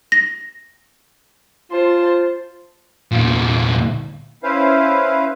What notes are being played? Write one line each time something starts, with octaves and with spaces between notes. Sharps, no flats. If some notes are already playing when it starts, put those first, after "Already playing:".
A#6
F4 C5 A5
E2 A#2
C#4 E4 B4 C5 F5